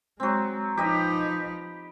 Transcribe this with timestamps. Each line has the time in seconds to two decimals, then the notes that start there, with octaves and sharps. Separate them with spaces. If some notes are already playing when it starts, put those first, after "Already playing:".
0.20 F#3 G#3 C4
0.77 F3 D#4 G4 B4 D#5